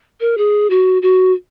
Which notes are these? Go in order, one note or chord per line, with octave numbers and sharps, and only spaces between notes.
A#4
G#4
F#4
F#4